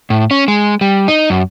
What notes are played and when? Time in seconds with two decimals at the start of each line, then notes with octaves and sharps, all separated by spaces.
0.10 A2
0.31 C#4
0.48 G#3
0.81 G3
1.08 D#4
1.30 F#2